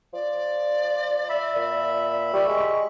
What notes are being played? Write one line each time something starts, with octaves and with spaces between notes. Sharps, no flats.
F3 D5
E5 B5
A#2
G3 C#6
G#3 C#6